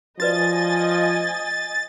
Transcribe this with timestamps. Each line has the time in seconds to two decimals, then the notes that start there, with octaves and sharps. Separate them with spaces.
0.20 F3 F#4 B4 D5 D#5 G#5 A6